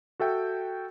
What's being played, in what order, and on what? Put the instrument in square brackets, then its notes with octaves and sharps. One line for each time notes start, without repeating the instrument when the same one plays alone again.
[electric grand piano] F#4 A4 E5 G5